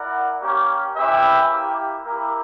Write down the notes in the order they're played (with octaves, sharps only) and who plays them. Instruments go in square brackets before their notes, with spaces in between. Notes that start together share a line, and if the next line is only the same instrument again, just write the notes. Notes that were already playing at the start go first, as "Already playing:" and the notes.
Already playing: [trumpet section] E4 A#4 D5 F#5
A#3 C#4 G4
C#4 E4 G4 B4 E5
A#3 E4 G4
A#3 E4 G4 A#4